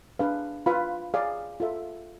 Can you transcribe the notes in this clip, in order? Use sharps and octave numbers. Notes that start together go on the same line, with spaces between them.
D4 G#4 B4 F5
F4 B4 F5 B5
G#4 D5 F5
F4 A4 E5